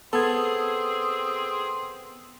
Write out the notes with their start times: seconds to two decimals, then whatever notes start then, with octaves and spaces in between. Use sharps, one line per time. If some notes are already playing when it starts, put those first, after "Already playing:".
0.13 B3 C4 G#4 A4 G#6